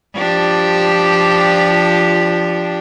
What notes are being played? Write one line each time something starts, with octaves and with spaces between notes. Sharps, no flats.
F3 D4 G4